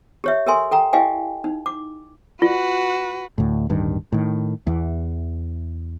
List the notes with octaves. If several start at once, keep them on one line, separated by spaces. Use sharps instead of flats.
G4 C#5 E5
G4 A4 A#4 E5 G#5 C6
A4 G5 A#5
E4 G4 D#5 F5 G5 G#5
D#4
D6
F4 F#4 B4
D2 A2
D1 G2 D#3
A2 D#3
E2 E3